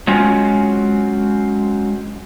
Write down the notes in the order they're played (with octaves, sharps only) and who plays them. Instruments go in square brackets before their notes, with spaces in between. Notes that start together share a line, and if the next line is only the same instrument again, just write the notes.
[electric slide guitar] F#3 G#3 C4 C#4 F4